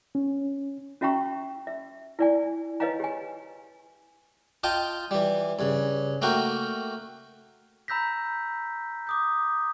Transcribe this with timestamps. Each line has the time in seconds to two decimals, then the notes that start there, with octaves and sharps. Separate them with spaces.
0.15 C#4
1.01 C#4 F#4 E5 G5 A#5 C#6
1.67 E5
2.19 E4 D5 G#5
2.80 B4 C#5 D#5 F5 G#5 A#5
3.00 G4 G#5
4.64 F4 D#5 G5 A5 D#6
5.11 E3 G3
5.59 G2 C#3
6.22 A3 A#3 F#4 A#4 G5
7.88 A#5 B5 E6 G6 A#6 B6
9.07 D6 D#6 G6